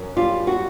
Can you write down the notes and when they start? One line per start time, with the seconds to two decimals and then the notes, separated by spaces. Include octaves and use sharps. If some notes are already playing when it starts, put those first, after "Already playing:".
Already playing: F#2
0.17 G3 F4
0.47 F#4